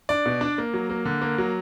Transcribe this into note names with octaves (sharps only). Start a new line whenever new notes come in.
D4 D5
B2
D4
A#3
F#3
A#3
D3
A#3
F#3